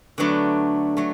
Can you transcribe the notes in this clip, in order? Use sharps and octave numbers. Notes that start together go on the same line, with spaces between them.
D3 F#3 A3 B3 D4
F#3 A3